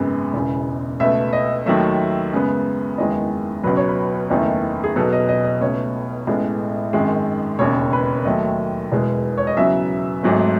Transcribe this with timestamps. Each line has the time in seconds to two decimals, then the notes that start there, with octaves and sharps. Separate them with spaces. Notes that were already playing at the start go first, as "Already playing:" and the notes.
Already playing: G#1 F#2 C#3 G#3 B3
0.34 E1 E2 C#3
1.00 C#2 B2 A3 E5
1.33 D#5
1.66 D#2 D#3 F#3 A3 E5
2.32 F#2 C#3 G#3 B3
2.98 F#1 E2 D#3 G#3 D#5
3.64 C#2 B2 F#3 B4
3.77 C#5
3.89 B4
4.30 F#1 E2 D#3 A3
4.84 G#4
4.96 B1 B2 F#3 A4
5.13 D#5
5.29 D#5
5.44 D#5
5.61 C#2 B2 A3 C#5
6.27 A1 A2 G#3 B3
6.93 G#1 F#2 D#3 G#3
7.59 E1 D#2 C#3 C#5
7.93 B4
8.25 D#2 D#3 F#3 A3 D#5
8.92 E1 E2 B2 G#3
9.38 C#5
9.47 D#5
9.57 E2 C#3 F#3 E5
10.23 G#1 G#2 F#3 A3